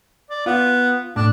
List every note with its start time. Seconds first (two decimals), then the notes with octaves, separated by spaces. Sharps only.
0.30 D5
0.46 B3 F4
1.16 A2 D4